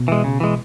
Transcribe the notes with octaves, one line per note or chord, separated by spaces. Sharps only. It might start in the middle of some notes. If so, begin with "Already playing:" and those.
Already playing: B2 B3
E3 G#3
C#3
E3 G#3